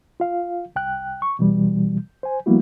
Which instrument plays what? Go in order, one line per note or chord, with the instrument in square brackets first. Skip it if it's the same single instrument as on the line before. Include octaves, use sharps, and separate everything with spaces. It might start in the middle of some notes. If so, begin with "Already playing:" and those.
[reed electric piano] F4 F5
C2 G5 F#6
C#6
B2 E3 G3
C5 G#5
F3 G3 A#3 B3 E4 F#4